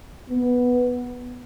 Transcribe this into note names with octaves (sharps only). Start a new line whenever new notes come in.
B3